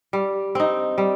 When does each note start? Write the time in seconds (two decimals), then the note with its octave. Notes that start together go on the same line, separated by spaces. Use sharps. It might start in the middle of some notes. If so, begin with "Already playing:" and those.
0.13 G3
0.55 C4 D#4
0.98 G3